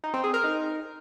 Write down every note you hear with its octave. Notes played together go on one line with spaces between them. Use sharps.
D#4
C4
G#4
A#4
D#4